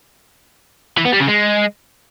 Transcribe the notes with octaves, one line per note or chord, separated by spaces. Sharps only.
E3
B3
G3
C#3
G#3